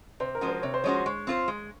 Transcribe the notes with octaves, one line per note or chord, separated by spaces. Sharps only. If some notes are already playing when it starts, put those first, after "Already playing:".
C3 C5
A#4
F3 G#3 C#4 F#4
C5
C3 C#5
C5
F3 G#3 C#4 F#4 C#5
C6
G#3 C#6
C4 F4 C5
G#3